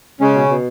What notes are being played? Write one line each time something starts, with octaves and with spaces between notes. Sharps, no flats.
C#3 G#3 C#4
B2
B2